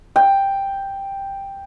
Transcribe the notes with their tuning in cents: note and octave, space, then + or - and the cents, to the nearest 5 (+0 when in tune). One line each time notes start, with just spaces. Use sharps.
G5 +5